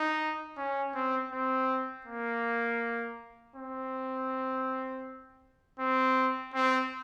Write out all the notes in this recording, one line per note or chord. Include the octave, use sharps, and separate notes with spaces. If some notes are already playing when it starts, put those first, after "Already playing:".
Already playing: D#4
C#4
C4
C4
A#3
C4
C4
C4